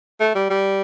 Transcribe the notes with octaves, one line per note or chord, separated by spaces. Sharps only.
A3
G3
G3